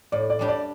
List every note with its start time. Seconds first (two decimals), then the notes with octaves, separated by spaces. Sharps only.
0.12 A2 D5
0.30 D5
0.39 G3 D4 G4
0.48 D5